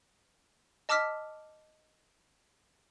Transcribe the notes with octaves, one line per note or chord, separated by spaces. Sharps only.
D#5 A5 D6 E6 F6 B6